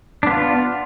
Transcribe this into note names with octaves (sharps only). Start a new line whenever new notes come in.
B3 D4 F4